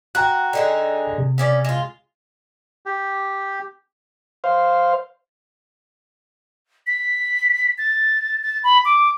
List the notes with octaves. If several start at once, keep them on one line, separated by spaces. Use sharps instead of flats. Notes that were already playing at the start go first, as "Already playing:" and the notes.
F#4 G5 A#5 F#6
D3 D#4 G#4
C3
C#3 C#4 D5
G#3 F4
G4
C5 F5
B6
A6
A6
B5
D6